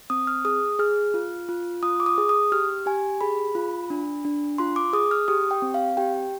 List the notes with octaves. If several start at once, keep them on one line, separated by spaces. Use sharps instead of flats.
C4 D#6
F6
G#4 D#6
G#4 F6
F4
F4
F4 D#6
D6
D#6
G#4
D#6
G4 F6
G4 G#5
G#4 B5
F4
D4
D4
F4 C6
D6
G#4 D#6
F6
G4 D#6
G5
C4
F5
G4 G5